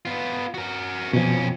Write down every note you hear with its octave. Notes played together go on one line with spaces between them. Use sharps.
B3 F4
F#4 A#4
F2 B2 F3 C#4